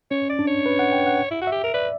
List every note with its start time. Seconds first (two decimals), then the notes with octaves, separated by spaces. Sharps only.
0.11 C#4 C#5
0.30 D5
0.39 D4
0.47 C#5
0.66 B4
0.79 F#5
0.93 G5
1.07 F#5
1.31 E4
1.41 F#4
1.47 G4 E5
1.64 A#4
1.74 B4 D5